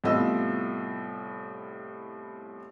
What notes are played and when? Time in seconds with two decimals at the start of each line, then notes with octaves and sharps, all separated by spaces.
0.04 C2 A2 B3 F4 D#5 E6